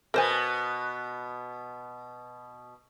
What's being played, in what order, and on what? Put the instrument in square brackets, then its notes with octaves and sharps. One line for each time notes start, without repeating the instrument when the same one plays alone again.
[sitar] B2 B3 [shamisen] A#4 C5 G#5